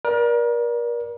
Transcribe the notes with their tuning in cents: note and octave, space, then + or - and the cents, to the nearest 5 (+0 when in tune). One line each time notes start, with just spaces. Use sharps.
A#4 +35 D5 +0